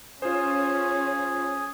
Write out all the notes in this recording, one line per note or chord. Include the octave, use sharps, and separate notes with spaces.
C#4 F4 G#4 C5